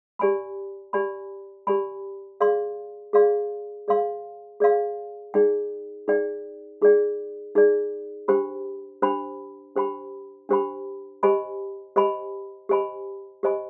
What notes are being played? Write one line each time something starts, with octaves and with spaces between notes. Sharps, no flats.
G4 D5 G#5 B5
G4 D5 G#5 B5
G4 D5 G#5 B5
G#4 D5 F5 C6
G#4 D5 F5 C6
G#4 D5 F5 C6
G#4 D5 F5 C6
D#4 G#4 D5 G5
D#4 G#4 D5 G5
D#4 G#4 D5 G5
D#4 G#4 D5 G5
D4 G4 C5 G5 B5
D4 G4 C5 G5 B5
D4 G4 C5 G5 B5
D4 G4 C5 G5 B5
G4 C5 D#5 G#5 B5
G4 C5 D#5 G#5 B5
G4 C5 D#5 G#5 B5
G4 C5 D#5 G#5 B5